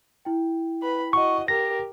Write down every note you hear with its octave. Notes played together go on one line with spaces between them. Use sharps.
E4 G5
B4 B5
F#4 D#5 C#6
G4 A#4 A#6